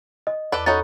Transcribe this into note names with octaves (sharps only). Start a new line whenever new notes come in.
D#5
E2 A4 B4 D5
C#4 D#4 F#4 A4 A#5 B5 A6